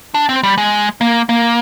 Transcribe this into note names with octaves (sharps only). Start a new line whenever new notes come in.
D4
C4
G3
G#3
A#3
A#3